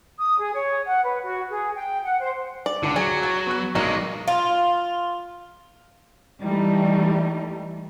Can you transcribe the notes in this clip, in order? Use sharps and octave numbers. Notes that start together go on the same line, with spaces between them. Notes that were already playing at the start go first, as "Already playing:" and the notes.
D#6
G#4
C#5
F#5
B4
F#4
G#4
G5
F#5
C5
D5
C#2 D3 D6
F#3 G#4 D5 A6
G#6 A6
B3 F#6
B1 F#3 G#3 D4 D#4 A#4
F4
E3 G3 A3 D#4